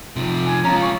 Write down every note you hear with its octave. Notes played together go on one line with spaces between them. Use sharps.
C3 F3
G#5
C#4 F4 A#5
C#6